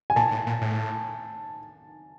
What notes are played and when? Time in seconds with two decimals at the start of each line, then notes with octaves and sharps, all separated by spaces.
0.10 G#5
0.16 A#2 A5
0.31 A2
0.47 A#2
0.61 A2